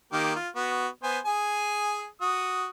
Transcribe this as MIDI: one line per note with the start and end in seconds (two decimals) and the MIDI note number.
0.12 0.34 51
0.12 0.34 58
0.12 0.34 67
0.36 0.48 65
0.56 0.88 59
0.56 0.88 66
1.03 1.19 59
1.03 1.19 72
1.03 1.19 80
1.25 2.06 68
1.25 2.06 80
2.21 2.68 66
2.21 2.68 87